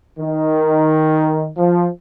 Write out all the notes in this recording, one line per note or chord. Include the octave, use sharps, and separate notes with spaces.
D#3
F3